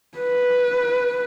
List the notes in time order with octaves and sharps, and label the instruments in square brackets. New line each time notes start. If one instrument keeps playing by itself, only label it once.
[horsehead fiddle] B4